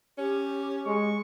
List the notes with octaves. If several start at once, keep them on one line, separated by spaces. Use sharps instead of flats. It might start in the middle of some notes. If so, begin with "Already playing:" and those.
C#4 G4
G#3 C#6